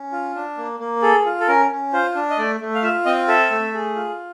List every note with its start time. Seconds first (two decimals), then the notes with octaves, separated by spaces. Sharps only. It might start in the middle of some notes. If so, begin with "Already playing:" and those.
Already playing: C#4
0.12 F4
0.35 D4
0.57 A#3
0.80 A#3
1.02 G#4 A4
1.25 F4
1.40 A4
1.48 C#4 A#4
1.71 C#4
1.93 F4 C5
2.15 D4
2.30 D#5
2.38 A3 D5
2.60 A3
2.75 F5
2.83 F4 E5
3.05 C4 D#5
3.28 A4 E5
3.51 A3
3.74 G#4
3.96 F4